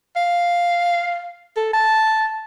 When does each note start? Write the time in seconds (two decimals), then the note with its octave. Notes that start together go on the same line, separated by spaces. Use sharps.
0.16 F5
1.56 A4
1.73 A5